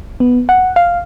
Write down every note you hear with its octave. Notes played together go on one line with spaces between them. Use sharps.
B3
F#5
F5